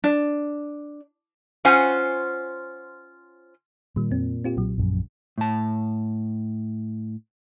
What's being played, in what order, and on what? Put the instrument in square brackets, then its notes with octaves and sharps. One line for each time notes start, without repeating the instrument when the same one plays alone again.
[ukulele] D4
[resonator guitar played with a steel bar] C#4 F4 C5 F#5 G#5
[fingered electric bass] A#2 [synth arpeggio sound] D#3 G3
[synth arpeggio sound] F2 C4
C4 F4 G4
B1 A#2 F#3
[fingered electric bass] A#1 F#2
[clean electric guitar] A2 A5